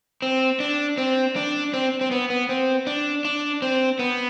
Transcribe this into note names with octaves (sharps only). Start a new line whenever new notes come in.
C4
D4
C4
D4
C4
C4
B3
B3
C4
D4
D4
C4
B3